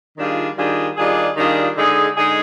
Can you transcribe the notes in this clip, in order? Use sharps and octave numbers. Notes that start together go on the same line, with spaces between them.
D#3 G3 D4 F4 G#4
D#3 G3 D4 F4 G#4
D#3 G3 D4 F4 G#4
D#3 G3 D4 F4 G#4
D3 G#3 D#4 G#4
D3 G#3 D#4 G#4